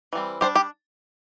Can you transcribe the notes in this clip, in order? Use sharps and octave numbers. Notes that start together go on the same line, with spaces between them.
E3 G3 C4
G3 D4 G4 C5
G4